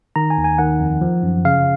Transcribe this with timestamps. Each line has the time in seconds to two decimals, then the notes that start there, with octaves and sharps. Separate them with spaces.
0.16 D#3 A#5
0.30 G#5
0.38 D#2
0.44 G#5
0.58 D#3 F#5
0.80 F2
1.01 F3
1.23 F#2
1.45 C#3 F5